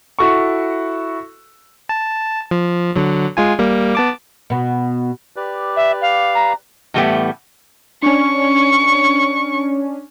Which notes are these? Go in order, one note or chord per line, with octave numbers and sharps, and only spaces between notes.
E4 F#4 A4 C#6
A5
F3
D3 F#3
G#3 F4 G#5
G3 A#3
B3 A5 D6
B2 B3
G4 B4 D5
E5
F5
A#5
A2 E3 G3 A3 B3 G4
C#4 D4 C#6